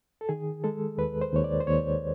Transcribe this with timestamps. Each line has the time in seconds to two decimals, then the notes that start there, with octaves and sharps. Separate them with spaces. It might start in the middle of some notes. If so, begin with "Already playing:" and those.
0.21 A4
0.29 D#3 G#4
0.64 G#3 A4
0.98 D#2 B4
1.21 C5
1.33 D#2 C#5
1.44 D5
1.60 C5
1.67 D#2 C#5